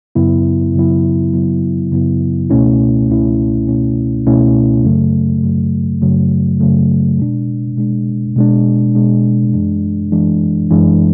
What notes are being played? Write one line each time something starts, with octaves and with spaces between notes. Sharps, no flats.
F#2 C#3 F#3 B3 E4
F#2 C#3 F#3 B3 E4
F#2 C#3 F#3 B3 E4
F#2 C#3 F#3 B3 E4
C#2 B2 A3 C#4 E4
C#2 B2 A3 C#4 E4
C#2 B2 A3 C#4 E4
C#2 B2 A3 C#4 E4
F#2 C#3 F#3 A3
F#2 C#3 F#3 A3
F#2 C#3 F#3 A3
F#2 C#3 F#3 A3
B2 G#3 D4
B2 G#3 D4
B2 G#3 D4
B2 G#3 D4
F#2 E3 G#3 D4
F#2 E3 G#3 D4
F#2 E3 G#3 D4